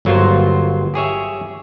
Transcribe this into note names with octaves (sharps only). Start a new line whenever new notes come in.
G1 F#3 A#3 F4 C5
G4 G#4 C#5 E5